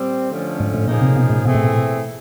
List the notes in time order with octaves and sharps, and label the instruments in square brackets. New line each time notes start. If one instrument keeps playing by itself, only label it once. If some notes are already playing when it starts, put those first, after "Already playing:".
Already playing: [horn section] A#2 G3 C4
D3 F3 A3 C#4
[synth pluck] G#2
A2
[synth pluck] A#2 [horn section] C#3 F3 A#3 D#4 G#4
[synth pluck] C3
B2
A2
[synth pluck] B2 [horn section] E3 A3 C4 E4 G#4
[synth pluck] A2
A#2